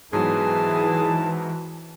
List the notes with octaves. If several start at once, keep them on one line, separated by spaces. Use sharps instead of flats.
G#2 E3 F#3 B3 G#4 A5